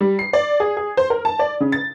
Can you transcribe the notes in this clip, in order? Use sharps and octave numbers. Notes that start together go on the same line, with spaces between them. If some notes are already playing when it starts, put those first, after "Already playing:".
G3
C7
D5
G#4
G#4
C5
A#4
A5
D5
C#3
A6